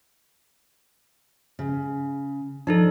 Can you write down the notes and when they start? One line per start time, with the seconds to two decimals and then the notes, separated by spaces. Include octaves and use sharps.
1.59 C#3
2.67 F3 D4 D#4 A4